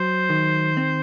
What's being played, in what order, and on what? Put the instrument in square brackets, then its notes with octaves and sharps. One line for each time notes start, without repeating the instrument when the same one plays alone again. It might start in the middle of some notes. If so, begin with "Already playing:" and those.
Already playing: [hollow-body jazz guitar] F#3 [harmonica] C5
[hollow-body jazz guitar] D#3
C4